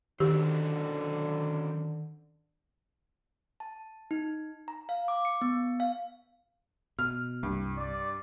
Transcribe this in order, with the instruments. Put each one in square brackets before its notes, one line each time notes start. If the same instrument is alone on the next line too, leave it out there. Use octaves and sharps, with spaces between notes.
[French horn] D3 [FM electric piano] D#3 [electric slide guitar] C#4 F#4 C5 [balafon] G4
[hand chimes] A5
D#4
A#5
F5
D6
C#7
B3
F5
[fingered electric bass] B2 [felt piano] F6
[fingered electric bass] C2 [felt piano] G2
[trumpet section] D5